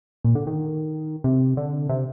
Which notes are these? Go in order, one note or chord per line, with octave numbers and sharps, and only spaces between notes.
A#2
D3
D#3
C3
D3
C3